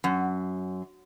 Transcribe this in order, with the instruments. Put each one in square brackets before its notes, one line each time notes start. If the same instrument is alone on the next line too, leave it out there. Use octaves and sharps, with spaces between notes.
[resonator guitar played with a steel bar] F#2